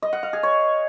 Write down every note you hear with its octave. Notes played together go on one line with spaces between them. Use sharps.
D#5
F#5
F5
G#4
C#5